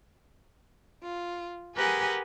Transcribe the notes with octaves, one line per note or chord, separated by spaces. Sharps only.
F4
G4 G#4 A#4 B4 F#5 G#5